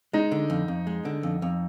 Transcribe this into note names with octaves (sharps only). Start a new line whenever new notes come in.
G#3 D#4
D3
F2
F2
G#3
D3
F2
F2